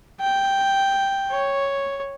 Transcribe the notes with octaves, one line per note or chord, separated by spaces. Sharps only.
G5
C#5